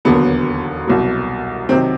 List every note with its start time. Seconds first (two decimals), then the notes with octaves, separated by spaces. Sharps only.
0.05 E1 D#2 D3 F#3 B3
0.87 C2 B2 F#3
1.69 C3 D#3 F#3 C4